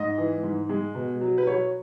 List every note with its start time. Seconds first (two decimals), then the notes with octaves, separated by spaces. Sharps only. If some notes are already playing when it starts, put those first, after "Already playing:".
Already playing: G#2 D#5
0.18 E3
0.43 G#2
0.69 G#3
0.95 B2
1.21 F#3
1.38 B4
1.47 F#3 C#5